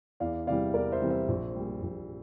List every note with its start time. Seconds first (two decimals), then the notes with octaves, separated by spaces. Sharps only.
0.20 E2 D5 F5
0.47 C3 E3 G3 D5 F5
0.74 E2 A#4 D5
0.92 C5 E5
1.01 C3 E3 G3
1.10 C5 E5
1.28 A#1
1.55 A#2 G3
1.82 A#1